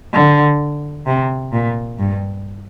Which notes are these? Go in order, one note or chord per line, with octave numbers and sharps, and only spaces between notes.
D3
C3
A#2
G2